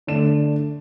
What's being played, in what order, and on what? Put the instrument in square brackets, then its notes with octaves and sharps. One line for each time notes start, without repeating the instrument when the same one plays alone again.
[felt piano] D3 A3 D4 E7